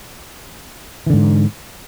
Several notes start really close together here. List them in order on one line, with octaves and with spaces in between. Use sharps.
E3 D3 G#2